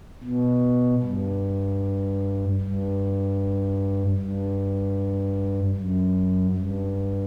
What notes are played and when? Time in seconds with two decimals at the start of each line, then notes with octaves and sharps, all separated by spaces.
0.24 B2
1.03 G2
2.61 G2
4.18 G2
5.76 F#2
6.56 G2